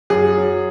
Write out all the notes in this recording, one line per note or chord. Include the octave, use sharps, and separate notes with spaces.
F#2 G#4
F#3